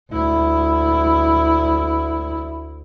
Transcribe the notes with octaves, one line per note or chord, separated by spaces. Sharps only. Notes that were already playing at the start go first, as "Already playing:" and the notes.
D2 E4